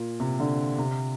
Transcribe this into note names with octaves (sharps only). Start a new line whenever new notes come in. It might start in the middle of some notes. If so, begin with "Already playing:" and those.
Already playing: A#2
C3
D3
C3